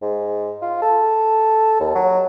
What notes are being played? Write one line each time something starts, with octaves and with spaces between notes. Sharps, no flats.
G#2
F4
A4
D#2
F#3